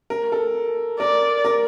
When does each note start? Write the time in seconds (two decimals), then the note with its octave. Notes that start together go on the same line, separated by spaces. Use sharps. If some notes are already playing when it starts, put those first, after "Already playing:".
0.10 A#4
0.32 A4
1.00 A#4 D5
1.45 A#4